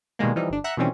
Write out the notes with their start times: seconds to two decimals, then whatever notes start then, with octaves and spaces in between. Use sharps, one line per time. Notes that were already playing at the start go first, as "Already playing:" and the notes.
0.19 B2 D#3 G3 G#3 A#3
0.36 E3 F3 G3 D#4
0.49 G1 D4
0.64 E5 F#5 A#5 F#6
0.77 B2 D#3 E3 G3 C4 C#4